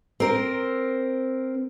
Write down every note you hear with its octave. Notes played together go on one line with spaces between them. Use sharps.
C4 A#4